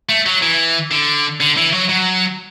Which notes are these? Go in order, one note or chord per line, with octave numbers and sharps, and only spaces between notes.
A3
F#3
E3
D3
D3
E3
F#3
F#3